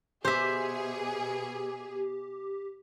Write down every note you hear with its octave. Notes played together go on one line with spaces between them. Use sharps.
B2 G4 G#4 C5 E5